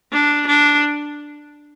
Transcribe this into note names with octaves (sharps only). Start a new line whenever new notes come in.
D4
D4